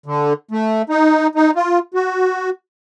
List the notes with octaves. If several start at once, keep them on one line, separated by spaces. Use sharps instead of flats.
D3
A3
D#4
D#4
F4
F#4